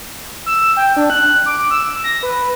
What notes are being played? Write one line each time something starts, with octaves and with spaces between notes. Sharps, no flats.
E6
G5
D4
F#6
D6
E6
A#6
B4